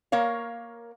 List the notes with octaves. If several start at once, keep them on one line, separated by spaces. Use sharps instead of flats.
A#3 A#4 C#5 F5